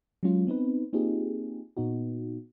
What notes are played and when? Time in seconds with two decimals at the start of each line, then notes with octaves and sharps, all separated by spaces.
0.23 F#3 G#3 C#4 F4
0.47 B3 C4 D#4 B4
0.93 A#3 C4 D#4 F4 G4 G#4
1.77 A#2 B3 D#4 F#4